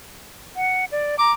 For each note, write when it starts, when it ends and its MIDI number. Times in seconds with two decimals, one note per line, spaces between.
0.56 0.85 78
0.92 1.19 74
1.19 1.33 82
1.19 1.33 86